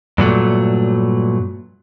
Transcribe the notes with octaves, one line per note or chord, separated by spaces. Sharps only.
G2 A#2 F#3 A3